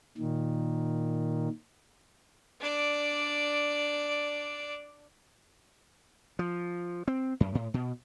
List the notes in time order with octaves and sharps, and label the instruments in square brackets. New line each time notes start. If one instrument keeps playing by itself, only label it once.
[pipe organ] A#2 D#3
[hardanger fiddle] D4 D5
[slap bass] F3
C4
F#2
A2
B2